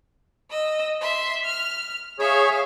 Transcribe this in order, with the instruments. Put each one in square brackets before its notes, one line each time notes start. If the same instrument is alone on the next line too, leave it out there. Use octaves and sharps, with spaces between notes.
[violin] D#5 E6
E5 C6
F6
[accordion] G#4 C#5 [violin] E5 F5